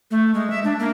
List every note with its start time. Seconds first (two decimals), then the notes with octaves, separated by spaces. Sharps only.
0.11 A3
0.34 G#3
0.50 E5
0.64 D4
0.79 A#3